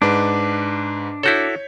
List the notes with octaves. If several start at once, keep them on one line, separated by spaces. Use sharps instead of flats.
G#2 D4 B4
E4 F#4 A4 C#5 G6 B6